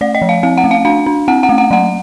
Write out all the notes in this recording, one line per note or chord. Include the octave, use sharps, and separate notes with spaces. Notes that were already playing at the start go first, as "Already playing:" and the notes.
A3 D5
D#5
F3
F5
C4 F5
F#5
A3
F5
D4 F5
D4
C4 F#5
F#5
A3
F#5
F#3 F#5